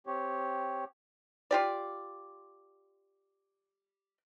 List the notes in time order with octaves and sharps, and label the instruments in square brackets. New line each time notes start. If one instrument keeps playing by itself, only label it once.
[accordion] C4 G4 C#5
[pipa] F4 G4 D5